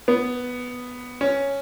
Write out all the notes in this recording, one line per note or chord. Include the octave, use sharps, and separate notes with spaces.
B3
C#4